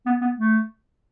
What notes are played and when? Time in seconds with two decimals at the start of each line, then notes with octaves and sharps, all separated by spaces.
0.06 B3
0.22 B3
0.38 A3